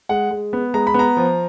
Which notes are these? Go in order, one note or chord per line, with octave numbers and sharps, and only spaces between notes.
G#3 F#5
G#3
B3
G#3 A#5
B5
B3 A#5
F3